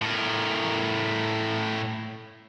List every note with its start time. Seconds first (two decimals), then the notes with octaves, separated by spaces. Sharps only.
0.02 A2 A#4